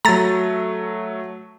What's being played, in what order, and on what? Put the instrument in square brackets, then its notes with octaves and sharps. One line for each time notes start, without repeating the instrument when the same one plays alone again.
[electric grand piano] F#3 A3 [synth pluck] A#5 A6